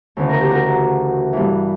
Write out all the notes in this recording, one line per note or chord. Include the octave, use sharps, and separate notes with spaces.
D2 C#3 E3 B4
A#4
G4
F#4 A#4
G2 E3